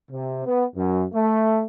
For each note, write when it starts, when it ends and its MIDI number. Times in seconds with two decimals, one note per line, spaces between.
0.10 0.43 48
0.46 0.64 59
0.75 1.04 42
1.13 1.64 57